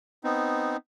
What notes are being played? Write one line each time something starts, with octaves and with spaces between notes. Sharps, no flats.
B3 C4 D#4